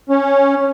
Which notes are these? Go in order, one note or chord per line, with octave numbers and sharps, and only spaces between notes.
C#4